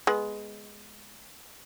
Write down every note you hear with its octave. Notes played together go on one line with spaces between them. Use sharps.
G#3 B3